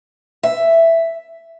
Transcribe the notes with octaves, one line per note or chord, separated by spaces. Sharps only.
E5